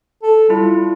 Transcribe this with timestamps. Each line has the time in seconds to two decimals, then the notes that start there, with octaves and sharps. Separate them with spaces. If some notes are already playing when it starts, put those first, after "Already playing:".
0.23 A4
0.50 G3 E4 F4